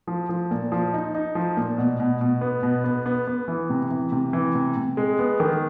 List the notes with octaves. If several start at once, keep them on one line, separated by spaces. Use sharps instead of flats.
F3
F3
A#2
F3
D#4
D#4
F3
A#2
B2
B2
B2
B3
B2
B3
B3
B3
E3
C3
E3
C3
E3
C3
C3
G#3
B3
D#3